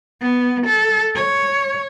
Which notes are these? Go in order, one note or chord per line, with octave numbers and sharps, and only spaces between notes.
B3
A4
C#5